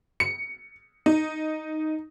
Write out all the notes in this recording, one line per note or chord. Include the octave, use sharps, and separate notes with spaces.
C#7
D#4